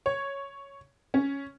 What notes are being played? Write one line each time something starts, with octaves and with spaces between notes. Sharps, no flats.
C#5
C#4